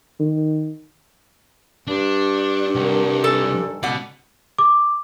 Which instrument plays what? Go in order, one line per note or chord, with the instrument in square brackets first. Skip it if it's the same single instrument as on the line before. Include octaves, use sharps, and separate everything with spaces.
[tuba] D#3
[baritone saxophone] G2 [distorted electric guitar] D4
[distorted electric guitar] C2 [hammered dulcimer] D#3 F#3 A4
[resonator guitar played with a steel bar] A4 [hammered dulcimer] G#5 A#5
[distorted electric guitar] C#2 D5 [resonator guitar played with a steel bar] B2 F#5
[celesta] D6